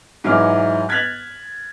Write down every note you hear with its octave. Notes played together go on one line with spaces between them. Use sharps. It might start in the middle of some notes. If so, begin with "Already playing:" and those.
G#2 E3 F#3 E4 D6 F6
F#6 G#6 A6 B6 F7 F#7